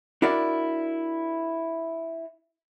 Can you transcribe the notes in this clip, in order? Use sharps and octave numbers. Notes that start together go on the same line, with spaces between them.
D4 E4 F#4 A#4 D5